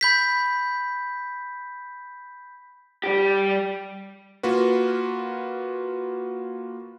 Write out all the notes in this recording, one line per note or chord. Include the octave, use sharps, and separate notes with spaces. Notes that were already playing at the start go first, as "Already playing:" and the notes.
B5 G6 B6
G3 G4
A#3 F4 F#4 B4